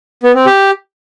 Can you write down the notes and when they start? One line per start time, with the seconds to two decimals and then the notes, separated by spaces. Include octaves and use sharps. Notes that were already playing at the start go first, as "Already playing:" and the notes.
0.23 B3
0.35 C4
0.46 G4